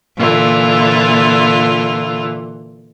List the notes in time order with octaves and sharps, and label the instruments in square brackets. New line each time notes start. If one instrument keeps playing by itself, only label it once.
[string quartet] A#2 D3 E3 F4